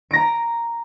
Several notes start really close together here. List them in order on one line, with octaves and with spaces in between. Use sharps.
D7 A#6 A#5